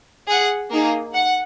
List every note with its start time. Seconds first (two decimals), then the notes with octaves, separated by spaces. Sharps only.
0.27 G#4 F#5
0.70 A#3 D#4 G#4
1.14 F#5